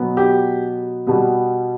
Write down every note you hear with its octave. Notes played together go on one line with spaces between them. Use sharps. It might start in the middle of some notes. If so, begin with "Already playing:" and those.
Already playing: B2 F#3 B3
G4
B2 G3 B3